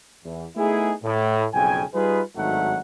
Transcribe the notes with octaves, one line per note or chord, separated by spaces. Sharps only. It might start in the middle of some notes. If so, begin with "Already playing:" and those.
E2
A3 B3 D#4 E4 G#4
A2
B1 F2 C#3 G5 G#5
G3 D#4 F4 G#4 B4
G#1 G2 F#3 A3 D#4 F#5